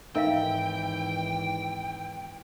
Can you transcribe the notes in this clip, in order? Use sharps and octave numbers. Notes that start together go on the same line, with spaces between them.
G#1 E3 D#4 A#4 E5 F5 G5